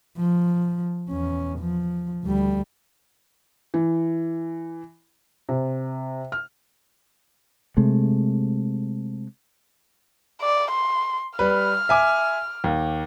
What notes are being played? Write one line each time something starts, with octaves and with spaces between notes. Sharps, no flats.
F3
E2 C#4
F3
D2 G3
E3
C3
F6
C3 G#3 A3
D5
C6
G3 B4 F6
E5 G#5 D6
D#2